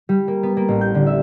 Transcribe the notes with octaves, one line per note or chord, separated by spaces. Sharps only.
G3
A#3
B3
A#3
A1
G6
D3
E5